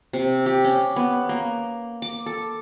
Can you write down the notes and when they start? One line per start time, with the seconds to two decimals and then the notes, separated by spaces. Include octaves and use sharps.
0.13 C3
0.46 G4
0.64 C#4
0.96 B3
1.29 A#3
2.02 D6
2.26 A4